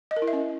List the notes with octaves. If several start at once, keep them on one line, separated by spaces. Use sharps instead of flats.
D#5
A#4
E4
E5
C#4